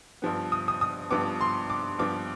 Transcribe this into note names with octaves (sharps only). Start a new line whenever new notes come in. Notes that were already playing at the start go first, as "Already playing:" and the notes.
G2 F3 B3
D#6
D#6
D#6
G2 F3 B3 D6
C6
D6
G2 F3 B3 D6